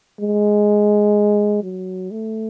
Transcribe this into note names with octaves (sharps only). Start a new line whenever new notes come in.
G#3
F#3
A3